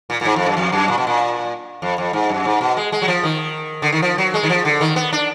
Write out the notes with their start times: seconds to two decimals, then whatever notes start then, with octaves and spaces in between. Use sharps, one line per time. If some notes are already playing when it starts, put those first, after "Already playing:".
0.10 A#2
0.21 A#2
0.25 G#2
0.36 F2
0.46 F#2
0.57 F2
0.72 F#2
0.88 A#2
0.98 B2
1.07 A#2
1.82 F2
1.98 F2
2.13 G#2
2.29 F#2
2.45 G#2
2.61 B2
2.77 G#3
2.92 G#3
3.02 F#3
3.08 F3
3.23 D#3
3.82 D3
3.92 D#3
4.02 F3
4.18 F#3
4.34 G#3
4.43 D#3
4.50 F3
4.65 D3
4.81 D#3
4.96 B3
5.13 D4